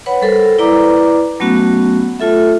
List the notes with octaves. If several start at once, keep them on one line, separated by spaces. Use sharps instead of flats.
B4 C#5 F#5 B5
G3 A4 A#4 C5
E4 B4 D5 A#5 D6
F#3 A3 B3 C#4 F#4
A3 F4 A4 E5